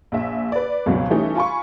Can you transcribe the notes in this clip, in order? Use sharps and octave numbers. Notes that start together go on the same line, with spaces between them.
A#1 E5
B4 D5
C#2 G#2 B2 F#3 B3
E3 G3 A3 C#4 D#4
F4 G#5 B5 C#6